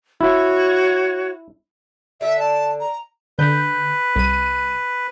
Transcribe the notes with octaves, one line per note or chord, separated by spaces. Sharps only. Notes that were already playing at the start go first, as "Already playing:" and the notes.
E4 F#4 C#5
D3 A4 E5
A5
A#5
D3 B4 G6
C2 D#7